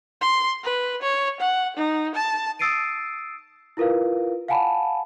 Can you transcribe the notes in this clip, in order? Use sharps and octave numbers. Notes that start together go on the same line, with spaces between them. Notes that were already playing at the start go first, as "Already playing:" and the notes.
C6
B4
C#5
F#5
D#4
A5
D#6 E6 A6 C7 D7 D#7
E4 F4 A#4 B4 F5
F5 F#5 G#5 A5 B5